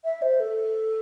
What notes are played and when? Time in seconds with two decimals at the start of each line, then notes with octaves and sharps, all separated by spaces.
0.04 E5
0.22 C5
0.40 A4